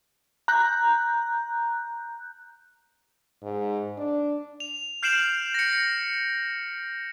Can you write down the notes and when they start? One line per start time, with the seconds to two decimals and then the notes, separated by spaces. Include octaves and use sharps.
0.48 A#5 F#6 G6
3.42 G#2
3.97 D4
4.60 F7
5.03 F6 G6 C7 D7 E7 F#7
5.54 A#6 C#7